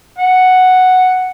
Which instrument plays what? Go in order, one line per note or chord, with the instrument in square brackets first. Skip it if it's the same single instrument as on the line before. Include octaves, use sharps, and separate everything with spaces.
[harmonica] F#5